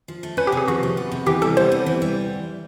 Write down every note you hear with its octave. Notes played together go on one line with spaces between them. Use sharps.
F3
A3
C#4 B4
G4
C3 G#4
F3 F#4
A3
B3
C3
E3 G4
G3 A4
B3 C5
C3
E3
G3